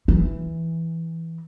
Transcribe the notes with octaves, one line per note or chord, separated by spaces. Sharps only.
E3